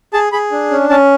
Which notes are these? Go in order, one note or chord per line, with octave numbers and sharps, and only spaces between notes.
G#4 A5
G#4 B5
D4
C#4
C#4 A5